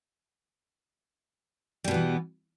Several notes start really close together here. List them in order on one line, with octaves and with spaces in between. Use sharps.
G3 B2 B3 E3